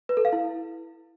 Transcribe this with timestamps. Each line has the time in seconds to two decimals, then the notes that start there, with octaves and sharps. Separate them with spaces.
0.09 B4
0.17 A4
0.25 F5
0.33 E4